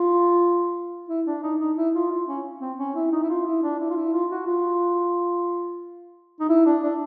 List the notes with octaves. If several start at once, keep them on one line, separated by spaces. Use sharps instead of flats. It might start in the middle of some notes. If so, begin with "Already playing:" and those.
Already playing: F4
E4
D4
D#4
D#4
E4
F4
F4
C#4
C4
C#4
E4
D#4
E4
F4
E4
D4
E4
F4
E4
F4
F#4
F4
D#4
E4
D4
D4